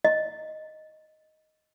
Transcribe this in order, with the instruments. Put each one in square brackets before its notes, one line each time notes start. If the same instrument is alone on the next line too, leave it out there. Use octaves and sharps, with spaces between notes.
[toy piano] D#5